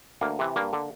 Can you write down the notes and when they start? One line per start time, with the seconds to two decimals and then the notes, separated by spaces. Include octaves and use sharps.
0.21 D2 A#3
0.39 C3 E3
0.56 G2 A#3
0.73 D3